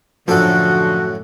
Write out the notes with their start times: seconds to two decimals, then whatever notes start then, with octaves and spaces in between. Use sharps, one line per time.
0.28 F#2 A2 D3 F3 F#4 A4